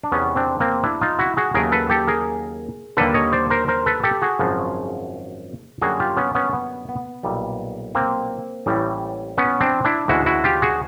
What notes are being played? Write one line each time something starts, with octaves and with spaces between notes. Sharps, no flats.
D4
E2 C3 D#3 B3 C#4
C4 D4
A#3 C4
D4 E4
D#4 F4
E4 F#4
F#4 G#4
D#2 C#3 F#3 A3 G#4 A#4
A4 B4
G4 A4
G#4 A#4
D#2 D3 G3 A#3 A4 B4
C#5 D#5
C5 D5
A#4 C5
A#4 C5
A4 B4
G4 A4
F#4 G#4
G#1 F#2 C#3 F3
F#2 D3 G3 A#3 F#4 G#4
F4 G4
B3 C#4
B3 C#4
B3
B3
B1 A#2 G3
A#3 C4
A1 A2 E3 G3
B3 C#4
C4 D4
D4 E4
D2 C#3 E3 G#3 E4 F#4
E4 F#4
F4 G4
F#4 G#4